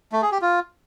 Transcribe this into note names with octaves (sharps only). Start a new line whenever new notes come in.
A3
G#4
G4
F4